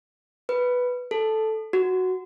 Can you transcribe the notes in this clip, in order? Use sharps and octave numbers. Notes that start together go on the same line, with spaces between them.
B4
A4
F#4